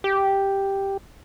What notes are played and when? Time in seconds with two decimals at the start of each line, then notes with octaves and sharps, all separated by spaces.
0.04 G4